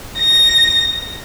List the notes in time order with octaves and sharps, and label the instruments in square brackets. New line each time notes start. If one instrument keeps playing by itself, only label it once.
[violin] A#6